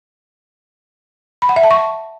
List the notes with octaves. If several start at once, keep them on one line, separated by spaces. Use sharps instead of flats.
B5
F#5
E5
A5
C#6